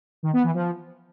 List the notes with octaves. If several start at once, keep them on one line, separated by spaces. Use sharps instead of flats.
D#3
B3
E3
F3